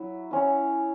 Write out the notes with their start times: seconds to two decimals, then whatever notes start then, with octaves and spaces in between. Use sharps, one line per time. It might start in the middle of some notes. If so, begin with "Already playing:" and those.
Already playing: F#3 E4
0.31 C#4 E4